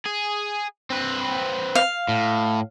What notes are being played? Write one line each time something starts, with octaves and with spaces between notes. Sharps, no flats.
G#4
C4 B4
F5
A2